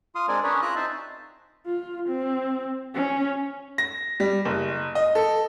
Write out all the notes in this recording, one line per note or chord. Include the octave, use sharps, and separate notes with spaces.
F4 F5 C6 D#6
G#3 C4 D4 A#4 D5 G#5
C#4 D4 G#4 A#4 B4 C#5
E4 F4 E5 A#5 F#6
C4 D#4 C5 E5 A5
F4
C4
C#4
A#6
G3
F#1
D#5
A4